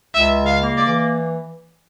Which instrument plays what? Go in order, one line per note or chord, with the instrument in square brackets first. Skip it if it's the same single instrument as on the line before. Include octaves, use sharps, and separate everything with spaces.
[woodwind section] C#2 [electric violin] E5
[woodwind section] C#3
[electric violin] F5
[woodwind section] A#3
[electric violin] D5
[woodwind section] E3